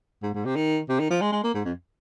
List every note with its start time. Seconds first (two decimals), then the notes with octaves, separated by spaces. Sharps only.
0.22 G#2
0.34 G#2
0.45 C3
0.56 D#3
0.89 C3
1.00 D#3
1.10 F3
1.21 G#3
1.32 G#3
1.44 A#3
1.54 G#2
1.65 F2